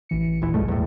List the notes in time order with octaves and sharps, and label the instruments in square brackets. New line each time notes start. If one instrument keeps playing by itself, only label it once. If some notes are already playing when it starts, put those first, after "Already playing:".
[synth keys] A1 E3 C#7
[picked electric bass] D#1 E3
[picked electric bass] B1 G2 A3 [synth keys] F#3 G#3
[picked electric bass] E2 A2